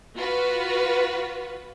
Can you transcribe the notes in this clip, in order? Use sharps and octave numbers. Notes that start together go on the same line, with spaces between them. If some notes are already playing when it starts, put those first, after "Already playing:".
F4 F#4 B4